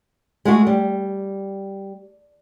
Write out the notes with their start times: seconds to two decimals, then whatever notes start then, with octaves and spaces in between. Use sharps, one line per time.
0.45 G#3 A3 F#4
0.67 G3